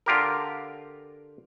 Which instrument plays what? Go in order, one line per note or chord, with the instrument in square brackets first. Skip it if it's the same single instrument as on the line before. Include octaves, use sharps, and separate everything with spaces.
[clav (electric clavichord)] D3 F4 G4 A#4